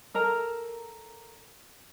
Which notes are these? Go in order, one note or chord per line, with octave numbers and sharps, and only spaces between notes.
A4 A#4 A#5